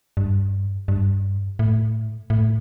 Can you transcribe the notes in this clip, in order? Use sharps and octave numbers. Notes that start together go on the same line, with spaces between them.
G2
G2
A2
A2